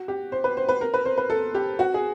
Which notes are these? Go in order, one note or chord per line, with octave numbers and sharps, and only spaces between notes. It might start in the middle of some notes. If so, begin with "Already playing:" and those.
Already playing: F#4
G4
C5
B4
C5
B4
A#4
B4
C5
B4
A4
G4
F#4
G#4